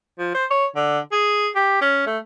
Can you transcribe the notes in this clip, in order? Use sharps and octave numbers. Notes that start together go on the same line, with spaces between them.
F3
C5
C#5
D3
G#4
G4
C#4
A3